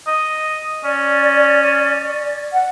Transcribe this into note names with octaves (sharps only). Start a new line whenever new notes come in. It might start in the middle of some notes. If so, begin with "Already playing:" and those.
D#5
C#4 D5
F#5